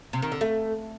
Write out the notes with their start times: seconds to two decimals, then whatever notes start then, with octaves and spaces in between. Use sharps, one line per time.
0.13 C3
0.22 D#3
0.32 D3
0.41 A3